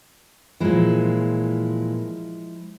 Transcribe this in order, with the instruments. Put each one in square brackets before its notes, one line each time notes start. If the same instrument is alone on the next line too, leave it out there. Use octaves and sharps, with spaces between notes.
[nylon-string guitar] A#2 E3 [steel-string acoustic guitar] F3 G#3 E4